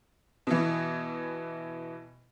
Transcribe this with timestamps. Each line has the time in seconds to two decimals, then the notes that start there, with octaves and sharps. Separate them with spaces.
0.47 B2 E3